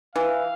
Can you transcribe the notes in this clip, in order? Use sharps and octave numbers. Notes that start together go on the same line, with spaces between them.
E3 F5